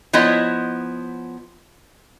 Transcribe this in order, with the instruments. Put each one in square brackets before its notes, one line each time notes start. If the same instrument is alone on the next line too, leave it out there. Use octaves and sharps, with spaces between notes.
[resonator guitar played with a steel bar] F3 B3 E4 C#5 D#5